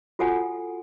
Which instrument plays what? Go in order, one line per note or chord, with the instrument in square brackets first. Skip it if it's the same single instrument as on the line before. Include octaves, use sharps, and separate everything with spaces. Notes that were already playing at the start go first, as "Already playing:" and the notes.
[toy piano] F4 F#4 A4 F#5 G#5